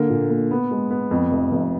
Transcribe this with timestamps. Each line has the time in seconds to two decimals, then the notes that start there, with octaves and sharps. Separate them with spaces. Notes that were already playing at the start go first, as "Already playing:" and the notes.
Already playing: D3 A#3
0.10 A#2
0.30 A#3
0.51 B3
0.71 G#3
0.91 B3
1.11 F2
1.31 F1
1.51 F1